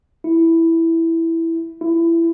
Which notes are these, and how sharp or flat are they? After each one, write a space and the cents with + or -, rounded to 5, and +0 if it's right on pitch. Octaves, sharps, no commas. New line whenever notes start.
E4 +0
E4 +20